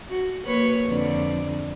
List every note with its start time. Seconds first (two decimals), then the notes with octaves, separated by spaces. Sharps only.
0.10 F#4
0.46 A#3 B4 C#5
0.86 F2 D3 D5